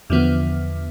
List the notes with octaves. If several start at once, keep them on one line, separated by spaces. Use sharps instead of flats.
E2 D3 F3 B3